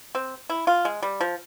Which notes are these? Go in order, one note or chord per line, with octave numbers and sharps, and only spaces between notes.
C4
E4
F4
G#3
G3
F3